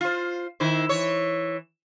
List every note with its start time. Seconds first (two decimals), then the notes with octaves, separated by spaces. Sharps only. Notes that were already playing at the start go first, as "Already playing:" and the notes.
0.01 F4 C5
0.60 D#3 E4 C5
0.89 E3 C#5